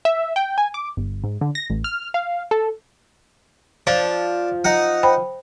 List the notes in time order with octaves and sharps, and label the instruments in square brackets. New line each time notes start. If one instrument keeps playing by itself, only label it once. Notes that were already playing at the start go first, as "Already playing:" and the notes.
[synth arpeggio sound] E5
G5
G#5
D6
G1
G#2
D3
A#6
A1
F6
F5
A4
[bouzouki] F3 [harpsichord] D4
[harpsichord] D#4 F#5
[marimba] C5 G5 B5